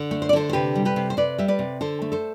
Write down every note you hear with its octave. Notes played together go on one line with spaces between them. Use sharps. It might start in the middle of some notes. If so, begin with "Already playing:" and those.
Already playing: D3
A3
C5
D5
D3 A4 C5
C5
C3 G4 B4
G3
G4 B4
C3
C5
C3 B4 D5
G3 E5
B4 D5
C3
D3 A4 C5
A3
A4 C5